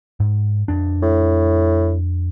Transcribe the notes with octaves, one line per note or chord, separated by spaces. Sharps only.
G#2
F2 D4
A2